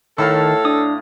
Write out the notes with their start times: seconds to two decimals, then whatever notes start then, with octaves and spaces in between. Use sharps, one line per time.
0.18 A2 D#3 E4 A4 F5
0.65 D4 D#6